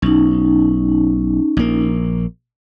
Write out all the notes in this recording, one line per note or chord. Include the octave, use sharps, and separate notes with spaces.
B1 C#4 D#4
A#1 A#3